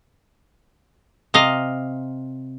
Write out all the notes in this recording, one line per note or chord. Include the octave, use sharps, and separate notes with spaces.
C3 D#5 F5